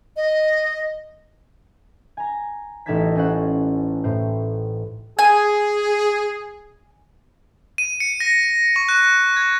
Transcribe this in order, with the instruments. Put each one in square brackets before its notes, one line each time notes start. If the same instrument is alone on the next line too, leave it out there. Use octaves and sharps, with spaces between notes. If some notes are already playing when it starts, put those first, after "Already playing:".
[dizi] D#5
[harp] G#5 A#5
A1 D#4 A4 A5 G#6 B6
C#4 A4 C5 F#5
A2 C5
[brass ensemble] G#4 [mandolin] G#5
[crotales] D#7
C#7
A#6
C#6
F#6
G#6